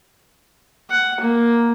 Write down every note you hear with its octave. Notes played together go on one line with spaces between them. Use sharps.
F#5
A#3